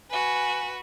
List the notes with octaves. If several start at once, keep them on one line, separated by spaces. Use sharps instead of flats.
F#4 B4 G#5